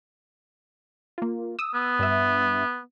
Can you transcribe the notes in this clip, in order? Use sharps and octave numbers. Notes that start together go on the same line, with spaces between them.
A#3 F4
D#6 E6
B3
G2 E5